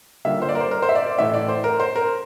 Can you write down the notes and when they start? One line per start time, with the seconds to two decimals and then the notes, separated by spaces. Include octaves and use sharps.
0.25 D3 G3 A#3 F4 E5
0.42 C5
0.49 D5
0.55 A#4
0.60 C5
0.71 A#4
0.82 C5
0.89 E5
0.95 D5
1.06 D5
1.18 A2 E3 A3 E4 E5
1.34 D5
1.48 C5
1.64 A#4
1.80 C5
1.96 A#4